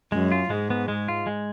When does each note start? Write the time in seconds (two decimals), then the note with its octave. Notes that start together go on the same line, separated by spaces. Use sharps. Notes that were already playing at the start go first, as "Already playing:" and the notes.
0.12 F#2 G#3
0.32 F4
0.50 G#2 G#3
0.70 B3
0.88 G#3
1.08 F4
1.27 G#3